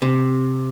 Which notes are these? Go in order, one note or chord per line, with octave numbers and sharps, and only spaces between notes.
C3